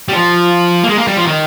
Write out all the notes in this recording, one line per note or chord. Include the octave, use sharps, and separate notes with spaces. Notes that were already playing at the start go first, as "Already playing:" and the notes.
G3
F3
A#3
G#3
A#3
G3
F3
D#3